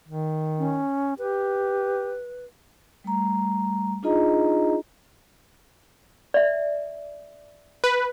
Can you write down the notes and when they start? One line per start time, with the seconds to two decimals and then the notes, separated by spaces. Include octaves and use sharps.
0.08 D#3
0.59 C#4
1.19 G4 B4
3.04 G3 A3 A#5
4.03 D4 D#4 F4 G#4 D#5 A#5
6.34 D5 E5
7.84 B4